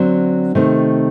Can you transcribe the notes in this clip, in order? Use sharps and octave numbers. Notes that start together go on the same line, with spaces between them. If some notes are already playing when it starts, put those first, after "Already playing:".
Already playing: D3 F#3 C4
C3 D#3 A3 C4